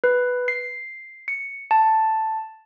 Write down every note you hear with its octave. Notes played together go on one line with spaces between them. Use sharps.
B4
C7
C#7
A5